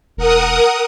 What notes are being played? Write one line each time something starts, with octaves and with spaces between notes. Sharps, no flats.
E1 A#4 F#5 D#6